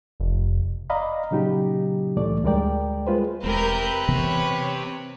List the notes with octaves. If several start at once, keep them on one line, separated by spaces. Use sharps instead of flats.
F1
D5 D#5 F5 A#5 B5
A#2 C#3 F#3 D#4 G4
C2 A2 E3 A3 D5
D2 G3 G#3 A#4 D5 G5
G#3 F4 B4 C5
E1 G#3 C4 G4 A#4 B4 G6
C3 E3 B3 C#5